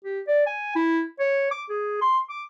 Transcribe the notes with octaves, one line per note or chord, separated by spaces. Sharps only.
G4
D5
G#5
E4
C#5
D6
G#4
C6
D6